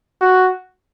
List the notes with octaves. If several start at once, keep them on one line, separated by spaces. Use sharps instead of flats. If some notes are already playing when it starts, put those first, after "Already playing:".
F#4